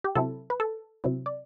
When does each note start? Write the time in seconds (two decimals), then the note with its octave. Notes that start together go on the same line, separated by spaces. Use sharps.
0.04 G4
0.15 C3 F#3 C4 E4 A4
0.50 B4
0.60 A4
1.04 C3 F#3 C4 E4
1.26 D5